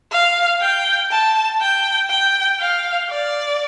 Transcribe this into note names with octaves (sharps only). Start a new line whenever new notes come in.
F5
G5
A5
G5
G5
F5
D5